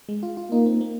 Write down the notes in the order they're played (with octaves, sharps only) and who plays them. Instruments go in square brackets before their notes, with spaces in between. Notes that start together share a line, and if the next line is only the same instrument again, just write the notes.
[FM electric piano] G#3
F4
F4
[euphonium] A#3 [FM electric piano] D#4
[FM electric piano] C4
A#3